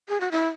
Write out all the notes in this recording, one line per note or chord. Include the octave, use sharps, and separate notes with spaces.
G#4
F#4
E4